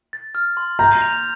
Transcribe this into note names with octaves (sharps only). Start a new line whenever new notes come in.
A6
F6
C6
A#5 G6
F7